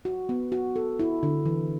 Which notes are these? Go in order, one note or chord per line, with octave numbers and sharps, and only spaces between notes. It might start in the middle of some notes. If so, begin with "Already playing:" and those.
F#4
B3
F#4
A4
E4
D3
E3